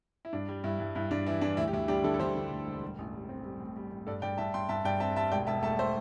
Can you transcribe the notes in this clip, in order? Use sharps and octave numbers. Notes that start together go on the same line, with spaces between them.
E4
G2 D4
G3
G2 E4
G2
G2 E4
G2 D4
E3 E4
E3 D4
D2 E4
G4
D2 E4
G3 D4 G4
D3 E4 A4
A4
D3 G4 C5
D3
D2
E1
G3
A1
G3
C4
G3
A2
G3
A2
G2 A4 D5
G2 D5 G5
G2 E5 A5
G2 G5 C6
G2 E5 A5
G2 D5 G5
C4 E5 A5
G3 E5 A5
E1 D5 G5
E1 E5 A5
A3 E5 A5
A3 C5 E5